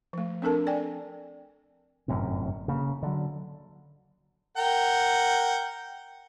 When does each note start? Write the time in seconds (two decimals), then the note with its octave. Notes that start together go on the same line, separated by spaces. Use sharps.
0.13 F3 A3
0.42 C4 D4 A4 A#4 A5
0.67 D5 G5 G#5
2.08 G1 F#2 A2 C3
2.68 C#3 A#3
3.02 D3 F#3
4.57 A#4 F#5 G5